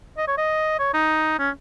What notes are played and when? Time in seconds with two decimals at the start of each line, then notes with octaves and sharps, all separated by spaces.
0.18 D#5
0.28 C#5
0.38 D#5
0.79 C#5
0.94 D#4
1.39 C#4